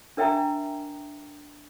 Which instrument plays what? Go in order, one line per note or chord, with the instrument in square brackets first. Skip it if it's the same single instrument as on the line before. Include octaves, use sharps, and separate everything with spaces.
[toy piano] D4 A#4 E5 G5 G#5 A#5